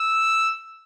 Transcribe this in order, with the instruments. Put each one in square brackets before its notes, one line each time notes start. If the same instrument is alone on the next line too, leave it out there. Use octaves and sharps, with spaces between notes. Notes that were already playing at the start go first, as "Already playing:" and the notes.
Already playing: [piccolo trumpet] E6